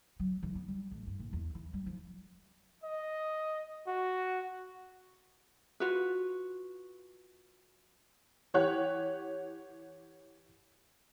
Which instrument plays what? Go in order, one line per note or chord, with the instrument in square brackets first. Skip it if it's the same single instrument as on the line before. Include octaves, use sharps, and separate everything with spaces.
[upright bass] F#3
E3
B3
G3
A1
G2
A#1
E2
E3
G3
F3
[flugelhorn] D#5
F#4
[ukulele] F4 F#4 B4
[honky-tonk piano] E3 G4 C#5 F#5 F#6